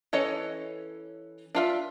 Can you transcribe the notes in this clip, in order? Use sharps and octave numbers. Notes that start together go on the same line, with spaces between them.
E3 C#4 A4 C#5 D#5
D4 F4 E5